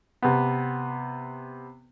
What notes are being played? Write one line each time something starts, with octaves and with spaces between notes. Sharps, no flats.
C3 B3